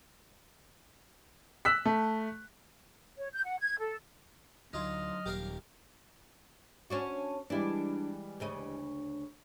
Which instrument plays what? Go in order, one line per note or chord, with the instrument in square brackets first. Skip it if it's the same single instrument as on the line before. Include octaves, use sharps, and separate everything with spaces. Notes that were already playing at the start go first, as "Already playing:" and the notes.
[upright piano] E6 F#6 B6
A3
[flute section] C#5
G6
F#5
G#6
A4
[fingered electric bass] D2 [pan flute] F#3 [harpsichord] D#4 F4 [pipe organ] D#5 F6
[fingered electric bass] D#1 [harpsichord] G4 A#4 F5
[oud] C#4 D4 F#4
[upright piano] E3 G3 G#3 [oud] D4 E4
[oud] D2 C#3 D#5